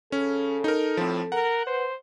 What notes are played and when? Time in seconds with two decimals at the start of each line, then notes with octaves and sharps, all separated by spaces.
0.12 C#3 C#4 A4
0.64 D#4 A#4
0.97 A2 F3 C4
1.32 A#4 F#5
1.67 B4 C5